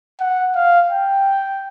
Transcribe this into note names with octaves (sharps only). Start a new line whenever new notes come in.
F#5
F5
G5